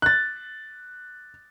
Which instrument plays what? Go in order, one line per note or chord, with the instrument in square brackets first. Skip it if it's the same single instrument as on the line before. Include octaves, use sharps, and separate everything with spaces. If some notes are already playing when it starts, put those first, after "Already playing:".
[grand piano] F#6 A6